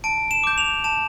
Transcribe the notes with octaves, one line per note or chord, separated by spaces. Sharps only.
A5 D7
E7
D6 G6
F7
A5 E7